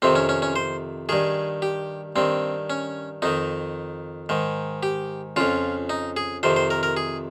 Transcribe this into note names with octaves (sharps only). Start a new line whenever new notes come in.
F2 C3 D#3 C4
C#4
C#4
C#4
C5
G2 D#3 G#4
G4
G2 D#3 C4
C#4
F2 D#3 D#4
G#2 D#3
G4
F2 C#3 F4
D#4
G#4
F2 C3 D#3 C5
C5
A#4
A#4
G#4